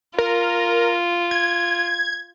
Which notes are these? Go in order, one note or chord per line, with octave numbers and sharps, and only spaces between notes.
F4 A#4
G#6